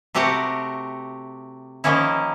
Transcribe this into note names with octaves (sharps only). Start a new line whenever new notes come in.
C3 A3 F#4 G4 A#4 F#5
D#3 F3 A#3 C#4 E4